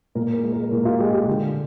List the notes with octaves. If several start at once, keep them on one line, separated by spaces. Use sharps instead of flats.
A#2 A#4
A#4
G#3
A#4
A#2 A#4
F4
G#3 G4
G4
D3